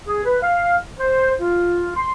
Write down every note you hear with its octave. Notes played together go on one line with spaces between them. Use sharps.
G#4
B4
F5
C5
F4
C6